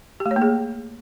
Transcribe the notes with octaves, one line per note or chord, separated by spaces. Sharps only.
G4
A3
C#5
A#3
G#4